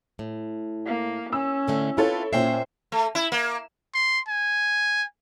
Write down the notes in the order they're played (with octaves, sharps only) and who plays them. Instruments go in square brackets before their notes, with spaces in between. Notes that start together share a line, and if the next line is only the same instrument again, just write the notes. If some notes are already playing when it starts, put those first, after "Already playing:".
[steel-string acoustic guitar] A2
[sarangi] A#3
[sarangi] C#4 [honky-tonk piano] E6
[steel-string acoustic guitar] A2 D3 A3
[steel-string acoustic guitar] C4 F4 B4 [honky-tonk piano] E4 A4 C#5
[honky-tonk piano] A#2 C#4 C7 [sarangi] C5 [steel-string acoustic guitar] E5 G5 A#5
[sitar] A3
E4
A#3
[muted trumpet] C6
G#5